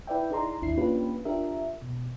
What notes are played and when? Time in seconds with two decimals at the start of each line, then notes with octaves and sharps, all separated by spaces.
0.07 E4 B4 D5 E5 G5
0.30 D#4 E4 G#4 D5 A#5 C6
0.62 G#1 D#2 D4 E4 C7
0.77 A#3 C#4 D4 F4 G4 B4
1.25 D4 F4 G4 A#4 E5
1.82 B2